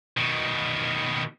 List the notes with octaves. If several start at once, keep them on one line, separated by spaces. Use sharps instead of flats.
B2 D#3